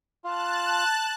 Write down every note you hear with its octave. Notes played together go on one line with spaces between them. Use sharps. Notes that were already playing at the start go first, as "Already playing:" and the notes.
F4 A5 F#6